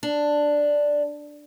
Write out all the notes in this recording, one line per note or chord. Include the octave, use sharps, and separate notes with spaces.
D4